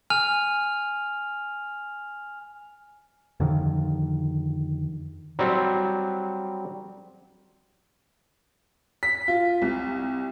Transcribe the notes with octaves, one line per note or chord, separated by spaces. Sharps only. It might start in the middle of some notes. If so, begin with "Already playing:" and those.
G#5 F6 F7
F2 D3 D#3 F3
F#3 G3 C4
B6
F4
C2